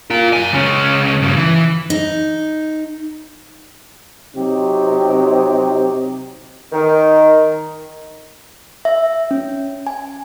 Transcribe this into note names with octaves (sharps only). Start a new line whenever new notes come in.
F4 A#4
F#2 G#5
C#2 C#4
G2 C#3
E3
D#4
C3 F#3 C4 D#4 G4
D#3
E5
C#4
G#5